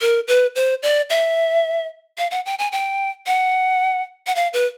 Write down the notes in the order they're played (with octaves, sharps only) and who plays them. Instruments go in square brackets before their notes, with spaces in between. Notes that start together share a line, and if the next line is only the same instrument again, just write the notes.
[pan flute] A#4
B4
C5
D5
E5
F5
F#5
G5
G#5
G5
F#5
F#5
F5
B4